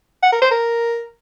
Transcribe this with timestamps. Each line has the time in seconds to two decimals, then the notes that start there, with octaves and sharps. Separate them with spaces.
0.23 F#5
0.32 A#4
0.42 C5
0.51 A#4